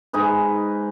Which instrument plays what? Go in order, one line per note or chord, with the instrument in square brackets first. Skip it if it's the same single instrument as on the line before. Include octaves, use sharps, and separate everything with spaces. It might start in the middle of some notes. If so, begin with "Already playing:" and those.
[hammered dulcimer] G#2 D#4 G#4 B4